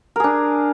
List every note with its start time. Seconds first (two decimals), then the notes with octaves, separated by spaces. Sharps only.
0.16 A#4
0.20 G#4
0.24 D4